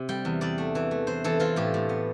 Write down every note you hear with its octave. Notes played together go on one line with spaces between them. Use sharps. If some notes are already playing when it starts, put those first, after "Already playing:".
Already playing: C3
G3 G5
E2
E2 D5
A3
E3
A3
E3 C5
E3 A4
E3 F4
A2 G4
A2
B3